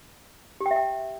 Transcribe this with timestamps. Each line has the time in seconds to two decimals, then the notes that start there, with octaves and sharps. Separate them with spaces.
0.61 G4
0.66 G5
0.71 E5
0.76 G5